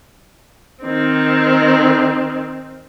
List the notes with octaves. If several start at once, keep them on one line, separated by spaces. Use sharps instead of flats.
D#3 C4